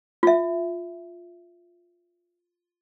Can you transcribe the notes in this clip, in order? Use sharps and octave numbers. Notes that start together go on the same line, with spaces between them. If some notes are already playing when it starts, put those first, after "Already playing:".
F4 E5